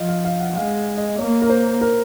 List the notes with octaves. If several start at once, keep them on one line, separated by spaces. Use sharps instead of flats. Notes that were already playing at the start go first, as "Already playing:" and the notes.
Already playing: F3 D#5
F5
F5
F#5
G#3 F5
D#5
A#3 C#5
A#4
C5
A#4